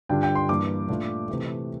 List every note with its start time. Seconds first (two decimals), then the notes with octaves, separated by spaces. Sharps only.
0.09 G2 D3 G3 D4 F4 G5
0.23 G5
0.35 C6
0.49 G2 E3 A#3 D4 D6
0.89 A#2 A3 D4 F4
1.28 C3 E3 A3